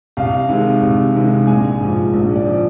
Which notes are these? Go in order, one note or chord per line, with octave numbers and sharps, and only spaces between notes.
C2 F5
C3 D#3 G#3
C2
C3 D#3 G#3
A#1 G#5
G#2 F3
A#1
D5
F3